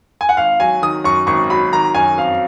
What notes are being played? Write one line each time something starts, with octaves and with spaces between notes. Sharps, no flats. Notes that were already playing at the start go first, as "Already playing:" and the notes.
G#5
F#5
G#1 F5
F#3 G#5
D#3 D#6
F#2 C#6
G#1 C#6
F#3 B5
D#3 A#5
F#2 G#5
F2 F5